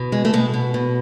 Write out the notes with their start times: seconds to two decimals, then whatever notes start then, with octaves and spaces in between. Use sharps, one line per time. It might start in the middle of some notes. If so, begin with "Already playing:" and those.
Already playing: B2
0.12 G#3
0.25 A3
0.33 B2 G#3
0.54 B2
0.74 B2